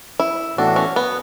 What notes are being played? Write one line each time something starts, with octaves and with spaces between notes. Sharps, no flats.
E4
A2 E3 B3 D4 F#4 A4
C#4
B3